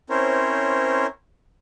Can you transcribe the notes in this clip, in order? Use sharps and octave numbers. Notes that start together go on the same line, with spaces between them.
C4 C#4 E4 A#4 C5 C#5